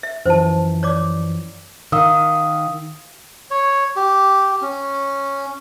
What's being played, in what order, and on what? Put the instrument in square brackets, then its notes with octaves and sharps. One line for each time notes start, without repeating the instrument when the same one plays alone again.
[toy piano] E5
[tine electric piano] F#2 E3 F3 [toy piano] C5 A5
[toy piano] C#5 D5 D6
[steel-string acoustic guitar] D#3 [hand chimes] F5 D#6 E6
[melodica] C#5
G4
C#4